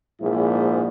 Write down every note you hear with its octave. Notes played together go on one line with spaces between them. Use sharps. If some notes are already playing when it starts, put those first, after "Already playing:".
A#1 G#2 E4